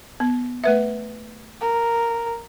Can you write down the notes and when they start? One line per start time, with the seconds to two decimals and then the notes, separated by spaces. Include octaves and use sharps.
0.20 B3
0.64 A3 B4 E5
1.61 A#4